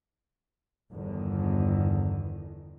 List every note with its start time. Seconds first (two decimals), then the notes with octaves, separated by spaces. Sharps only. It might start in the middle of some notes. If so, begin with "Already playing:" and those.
0.91 G1 E2 D3 D#3